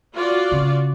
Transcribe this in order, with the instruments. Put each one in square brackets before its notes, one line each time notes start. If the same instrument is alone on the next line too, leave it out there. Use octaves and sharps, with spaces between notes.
[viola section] F4 F#4 D5
[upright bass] C#3